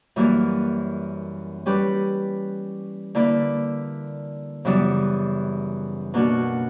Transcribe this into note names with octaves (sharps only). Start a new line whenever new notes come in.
F#2 E3 G3 A#3
G3 C#4 G4 B4
D3 A#3 E4 B4 D5
F#2 C#3 E3 G3 B3
B2 A#3 D4 F#4